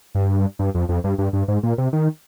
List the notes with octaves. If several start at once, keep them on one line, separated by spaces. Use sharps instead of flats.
G2
G2
F2
F2
G2
G2
G2
G#2
A#2
C3
D#3